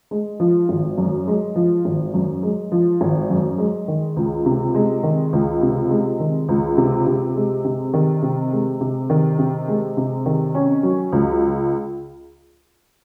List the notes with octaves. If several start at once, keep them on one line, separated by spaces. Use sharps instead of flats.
G#3
F3
G#1
F#2
G#3
F3
G#1
F#2
G#3
F3
G#1
F#2
G#3
D#3
C#2
C3
G#3
D#3
C#2
C3
G#3
D#3
C#2
C3
C3
G#3
C3
D#3
C3
G#3
C3
D#3
C3
G#3
C3
D#3
C#4
F#3
C#2